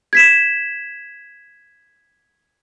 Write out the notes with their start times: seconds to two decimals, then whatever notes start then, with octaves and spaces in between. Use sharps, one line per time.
0.13 G#6 B6 E7